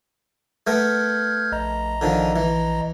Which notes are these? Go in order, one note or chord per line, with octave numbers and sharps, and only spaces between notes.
A3 B3 A#4 F6 G6 G#6
A#1 D#5 A#5
D3 D#3 F3
E3